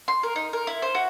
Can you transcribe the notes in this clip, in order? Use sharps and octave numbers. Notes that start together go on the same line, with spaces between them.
C6
A#4
D#4
A#4
E4
C5
F#4